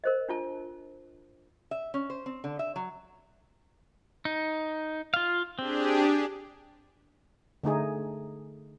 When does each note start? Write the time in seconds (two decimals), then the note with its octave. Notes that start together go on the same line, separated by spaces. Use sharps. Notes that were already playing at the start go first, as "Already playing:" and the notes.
0.04 A#4 C5 D#5
0.28 D4 F4 A5
1.71 E5
1.94 C#4
2.10 C5
2.26 C4
2.44 D3
2.59 E5
2.76 F#3
4.25 D#4
5.14 F4 F5
5.59 C4 D4 G4 G#4
7.63 D3 A3 D#4 G#4